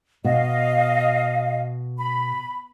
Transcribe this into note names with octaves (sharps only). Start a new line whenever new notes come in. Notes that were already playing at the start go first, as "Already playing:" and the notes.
B2 D#5 F5
B5